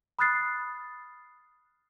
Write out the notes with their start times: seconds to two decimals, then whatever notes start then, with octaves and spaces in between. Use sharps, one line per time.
0.19 B5 D#6 F6 F#6 A6 C7